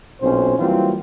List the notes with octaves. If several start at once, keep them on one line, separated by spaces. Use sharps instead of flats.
B1 A#2 C4 C#4 C5
E3 F#3 G3 A#3 C4 F4